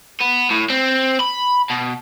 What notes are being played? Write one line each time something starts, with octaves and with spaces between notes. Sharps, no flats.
B3
A2
C4
B5
B2